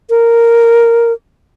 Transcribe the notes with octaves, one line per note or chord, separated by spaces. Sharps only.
A#4